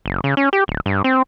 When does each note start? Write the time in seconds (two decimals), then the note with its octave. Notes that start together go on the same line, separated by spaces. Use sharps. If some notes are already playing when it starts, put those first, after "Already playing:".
0.06 F#1
0.24 C#3
0.37 C#4
0.53 G4
0.68 D1
0.86 G2
1.04 C4